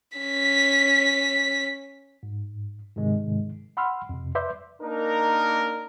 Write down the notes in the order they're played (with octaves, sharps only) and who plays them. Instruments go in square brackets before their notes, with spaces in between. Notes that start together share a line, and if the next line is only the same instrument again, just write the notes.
[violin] C#4 B6
[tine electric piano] G#2
G#2 C3 D#3 G#3
F#5 B5 C6 E6 F6
F2 C3
B4 D5 E5 C6 D6 G6
[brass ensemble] A#3 D4 D#4 A#4